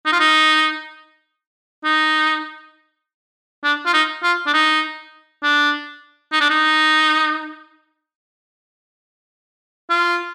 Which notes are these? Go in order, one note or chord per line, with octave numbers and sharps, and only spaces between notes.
D#4
F4
D#4
D#4
D4
F4
D#4
F4
D4
D#4
D4
D#4
D4
D#4
F4